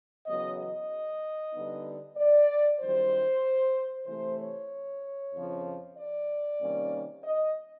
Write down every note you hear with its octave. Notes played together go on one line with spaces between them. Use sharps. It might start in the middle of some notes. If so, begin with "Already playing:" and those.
E2 C#3 F#3 B3 D#5
D#5
D3 G3 B3 D#4
D5
F#2 D#3 G3 C5
C3 E3 A3 C5
C#5
F2 C#3 F3
D5
C3 D#3 G3 A#3 C#4
D#5